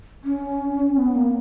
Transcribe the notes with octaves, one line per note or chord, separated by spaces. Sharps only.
C#4
B3
A#3